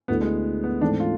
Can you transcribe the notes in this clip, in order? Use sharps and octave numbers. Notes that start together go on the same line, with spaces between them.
D2 D3 A3 B3 E4 A4
G#3
B3
G#2 E3 A3 C4 D4
F4